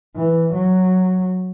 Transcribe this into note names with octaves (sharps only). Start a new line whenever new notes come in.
E3
F#3